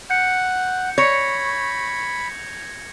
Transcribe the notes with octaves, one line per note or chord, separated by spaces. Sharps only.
F#5 G6 C#7
C#5 B5 G#6 A#6 C#7